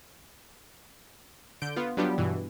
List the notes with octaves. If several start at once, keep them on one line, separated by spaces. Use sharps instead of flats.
D3 G6 D7
B3 F4
F#3 G3 B3 D4 F4 G4
G2 B2 E3